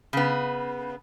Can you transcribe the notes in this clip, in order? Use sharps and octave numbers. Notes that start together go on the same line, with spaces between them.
C#3 B3